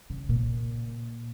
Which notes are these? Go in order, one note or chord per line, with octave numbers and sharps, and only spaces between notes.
C#3
A#2